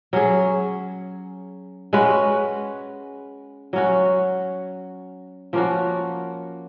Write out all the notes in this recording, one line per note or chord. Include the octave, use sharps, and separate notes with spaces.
F#3 C#4 G#4
G#3 C#4 F#4 B4
F#3 C#4 F#4
F3 A#3 C#4 F#4